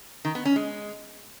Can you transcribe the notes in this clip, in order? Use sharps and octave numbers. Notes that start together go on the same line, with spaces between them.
D#3
B3
C#4
G#3